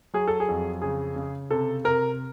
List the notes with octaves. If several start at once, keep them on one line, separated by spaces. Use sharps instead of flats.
F#3 G#4
A4
G#4
F2
C#3 G#4
C#3
C3 A4
C3 A#4